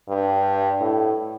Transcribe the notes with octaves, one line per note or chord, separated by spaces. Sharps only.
G2
A2